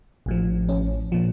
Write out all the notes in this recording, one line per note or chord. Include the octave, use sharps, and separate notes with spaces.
A1 A2 F3
C#4
A#2 F3